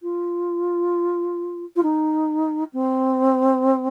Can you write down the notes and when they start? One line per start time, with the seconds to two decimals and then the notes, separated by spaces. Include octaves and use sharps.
0.02 F4
1.76 F4
1.83 D#4
2.73 C4